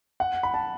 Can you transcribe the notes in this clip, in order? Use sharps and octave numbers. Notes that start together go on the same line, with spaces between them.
F#5
B5
A5